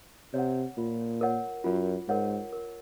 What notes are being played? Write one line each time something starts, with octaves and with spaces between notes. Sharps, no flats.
C3 C#5 F#5
A#2 F4
A#4 C#5 F#5
F#2 F4
G#2 A#4 C#5 F#5
A#4